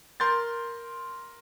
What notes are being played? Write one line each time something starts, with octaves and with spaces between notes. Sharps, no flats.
A#4 C6 G6 A6